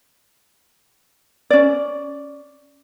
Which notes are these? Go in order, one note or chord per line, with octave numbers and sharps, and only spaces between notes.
C#4 D5